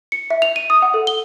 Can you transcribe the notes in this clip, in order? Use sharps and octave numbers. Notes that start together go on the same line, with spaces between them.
C#7
E5
F7
D#7
D#6
F#5
A4
G7